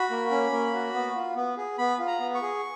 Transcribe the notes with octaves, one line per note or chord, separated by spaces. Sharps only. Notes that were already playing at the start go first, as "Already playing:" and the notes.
Already playing: F#4 B5
A#3
C#4
A#3
F#4
B3
F4
B3
G#4
B3 B5
F4
A#5
B3
C#6
G#4